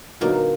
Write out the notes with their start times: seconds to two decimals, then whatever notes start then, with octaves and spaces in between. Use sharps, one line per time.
0.21 A#2 D3 F#3 A#3 B3 D#4 F#4